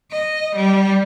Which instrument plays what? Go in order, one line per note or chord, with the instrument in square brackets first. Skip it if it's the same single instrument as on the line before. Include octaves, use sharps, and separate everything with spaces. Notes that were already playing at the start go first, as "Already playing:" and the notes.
[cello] D#5
G3